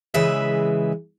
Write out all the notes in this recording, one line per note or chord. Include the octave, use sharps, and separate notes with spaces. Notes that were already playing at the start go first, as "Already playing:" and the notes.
C#3 E3 G#3 B4 E5